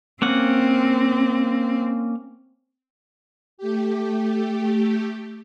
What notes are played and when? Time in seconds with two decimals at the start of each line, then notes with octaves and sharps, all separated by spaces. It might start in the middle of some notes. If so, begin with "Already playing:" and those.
0.22 A#3 C4 C#4 F#5
3.58 A3 G4